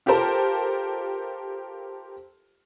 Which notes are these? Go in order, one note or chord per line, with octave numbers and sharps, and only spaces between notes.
F4 G4 A4 A#4 C5 A5